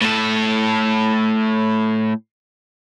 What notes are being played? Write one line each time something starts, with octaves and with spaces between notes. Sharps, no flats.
A2 A4